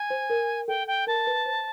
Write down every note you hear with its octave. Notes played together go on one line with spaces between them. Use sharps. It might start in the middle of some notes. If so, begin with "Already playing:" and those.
Already playing: G#5
C5
A#4
A4 G5
G5
A#4 A5
B4
C5